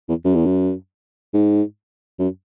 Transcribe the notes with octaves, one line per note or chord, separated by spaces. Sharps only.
E2
F#2
E2
F#2
G#2
F#2